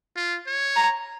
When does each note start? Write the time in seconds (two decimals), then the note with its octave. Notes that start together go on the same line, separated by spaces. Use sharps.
0.16 F4
0.47 C#5
0.76 A#5